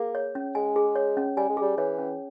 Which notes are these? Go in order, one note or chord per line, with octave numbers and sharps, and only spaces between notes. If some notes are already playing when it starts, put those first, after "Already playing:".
Already playing: A#3 G#4
C#5
C#4
G#3 G#5
G#4
C#5
C#4
G3 G#5
G#3
G3 G#4
E3 C#5
C#4